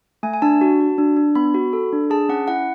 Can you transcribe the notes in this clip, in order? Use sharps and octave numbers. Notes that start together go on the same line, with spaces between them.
A3 G#5
G#5
D4 A5
F#4
F#4
D4
D4
B3 B5
F#4
A4
D4
G#4 A5
C#4 F#5
E4 F#5